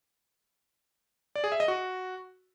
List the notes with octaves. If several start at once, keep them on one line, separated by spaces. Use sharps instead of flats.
D5
G#4
E5
D#5
F#4